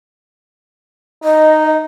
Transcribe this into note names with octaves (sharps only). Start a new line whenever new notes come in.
D#4 D#5